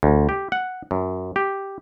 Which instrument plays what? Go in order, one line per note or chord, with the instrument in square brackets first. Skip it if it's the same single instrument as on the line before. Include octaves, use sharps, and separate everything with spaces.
[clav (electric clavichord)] D2
G4
F#5
F#2
G4